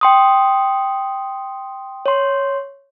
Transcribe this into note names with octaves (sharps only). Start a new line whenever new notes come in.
G5 C6 D#6
C#5 C6